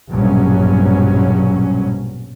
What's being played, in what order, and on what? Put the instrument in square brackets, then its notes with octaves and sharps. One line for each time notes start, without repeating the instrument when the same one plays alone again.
[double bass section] A#1 G2 B2 F#3 C#4